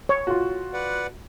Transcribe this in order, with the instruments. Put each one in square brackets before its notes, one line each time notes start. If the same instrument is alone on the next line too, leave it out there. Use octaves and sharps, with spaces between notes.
[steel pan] C#5
[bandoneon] A2 [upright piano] F4 F#4
[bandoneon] B4 D5 F#5